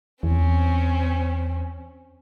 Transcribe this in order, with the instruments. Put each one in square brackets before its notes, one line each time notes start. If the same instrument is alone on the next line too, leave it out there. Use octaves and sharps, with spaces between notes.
[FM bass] E2 [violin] C4 C#4